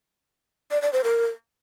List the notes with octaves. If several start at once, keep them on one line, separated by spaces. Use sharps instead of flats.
D5
D5
C5
A#4